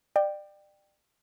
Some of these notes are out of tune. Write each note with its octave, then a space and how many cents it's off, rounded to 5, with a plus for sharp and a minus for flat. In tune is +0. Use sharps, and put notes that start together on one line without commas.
D5 +30 G5 +0